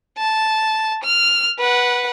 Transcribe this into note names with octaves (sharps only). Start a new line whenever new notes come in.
A5
F6
B4 F#5